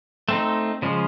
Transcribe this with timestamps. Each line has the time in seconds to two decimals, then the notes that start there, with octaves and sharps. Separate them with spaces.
0.29 A3 C4 D#4
0.82 C#3 F3 G#3